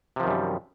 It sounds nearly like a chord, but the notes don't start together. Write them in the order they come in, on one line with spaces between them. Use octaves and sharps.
C3 F3 D#3 F#2 G3